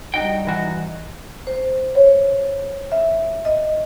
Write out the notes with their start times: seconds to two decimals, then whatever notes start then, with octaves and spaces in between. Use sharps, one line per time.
0.14 G3 D#4 F#4 G5
0.47 E3 F#4
1.47 C5
1.95 C#5
2.92 E5
3.45 D#5